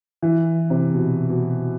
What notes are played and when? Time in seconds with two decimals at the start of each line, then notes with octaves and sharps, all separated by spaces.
0.23 E3
0.70 C3
0.94 B2
1.30 B2